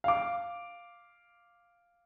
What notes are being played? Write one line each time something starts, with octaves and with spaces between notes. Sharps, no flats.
F5 D6